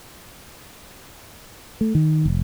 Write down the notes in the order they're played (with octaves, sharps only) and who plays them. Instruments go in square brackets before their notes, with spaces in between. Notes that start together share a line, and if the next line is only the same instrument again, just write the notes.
[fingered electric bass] A3
D#3
F1